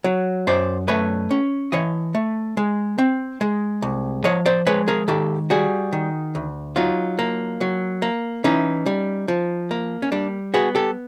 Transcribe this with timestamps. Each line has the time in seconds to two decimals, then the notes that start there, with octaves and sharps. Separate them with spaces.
0.04 F#3
0.47 F#2 C5 D5
0.88 A3 B4 C#5
1.31 C#4
1.72 E3 C#5 D#5
2.15 A3
2.57 G#3
2.98 C4
3.41 G#3
3.82 C2
4.24 F3 C#5 D#5
4.46 C5 D5
4.67 G#3 B4 C#5
4.88 G#4 A#4
5.08 D#3 G4 A4
5.50 G3 F#4 G#4
5.93 D#3
6.35 D2
6.76 F#3 D#4 F4
7.19 A#3
7.61 F#3
8.02 A#3
8.44 E3 C#4 D#4
8.86 G3
9.28 F3
9.71 A#3
10.02 C#4
10.12 G3 D4
10.54 B3 F#4 G#4
10.75 G4 A4